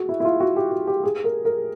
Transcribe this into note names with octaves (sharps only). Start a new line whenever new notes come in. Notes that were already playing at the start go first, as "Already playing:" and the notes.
Already playing: F#4 G#4
E4
E4
F4
F#4
G4
F#4
G4
G#4
A#4
A#4